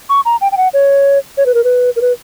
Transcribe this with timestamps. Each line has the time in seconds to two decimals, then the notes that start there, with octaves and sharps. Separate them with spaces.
0.09 C#6
0.25 A#5
0.41 G5
0.52 G5
0.57 F#5
0.74 C#5
1.37 C#5
1.46 B4
1.54 A#4
1.64 B4
1.96 A#4
2.01 B4